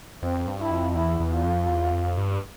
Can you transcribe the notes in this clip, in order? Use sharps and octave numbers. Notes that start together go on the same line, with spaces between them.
F2 C4
G2
E4
F2
E2 E4
E2
F4
F2
E2
F2
G2